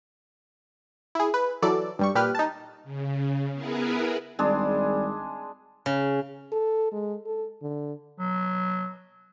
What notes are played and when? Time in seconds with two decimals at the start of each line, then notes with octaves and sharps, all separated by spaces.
1.15 E4 G#4
1.34 B4
1.62 E3 F#3 A4 D5
1.99 G2 G3 C#6
2.15 A#2 G4 B4 F6
2.35 D#4 A5
2.84 C#3
3.54 B3 E4 G#4 A#4 B4
4.39 G#1 G3 G#3 D4 G#4
5.86 C#3
6.52 A4
6.92 G#3
7.26 A4
7.62 D3
8.19 F#3